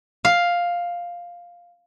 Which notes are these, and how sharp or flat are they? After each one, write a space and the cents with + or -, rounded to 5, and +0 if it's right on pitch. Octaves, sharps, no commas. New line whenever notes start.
F5 +5